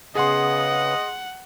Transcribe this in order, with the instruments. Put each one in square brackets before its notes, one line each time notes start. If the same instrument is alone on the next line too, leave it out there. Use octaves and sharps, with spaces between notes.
[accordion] C#3 B3 [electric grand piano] G#4 C6 [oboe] D#5 [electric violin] F#5